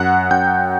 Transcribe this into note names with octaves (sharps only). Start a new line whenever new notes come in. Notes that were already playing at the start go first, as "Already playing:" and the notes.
Already playing: F#2 F#5 F#6
F#2 G5 G6